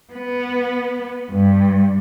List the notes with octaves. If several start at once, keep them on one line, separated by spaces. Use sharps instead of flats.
B3
G2